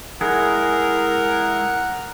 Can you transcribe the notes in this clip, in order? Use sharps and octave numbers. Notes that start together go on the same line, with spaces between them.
G#3 E4 G#4 A#4 F#5